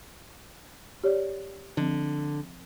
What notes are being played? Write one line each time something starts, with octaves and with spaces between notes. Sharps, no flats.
G4 C#5 D5
D3 F3 C4